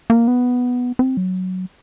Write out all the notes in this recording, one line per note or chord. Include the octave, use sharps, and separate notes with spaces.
A#3
B3
C4
F#3